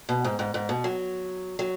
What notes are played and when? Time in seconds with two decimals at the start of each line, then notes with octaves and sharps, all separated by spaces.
0.09 B2
0.24 G#2
0.39 G#2
0.54 G#2
0.69 B2
0.84 F#3
1.59 F#3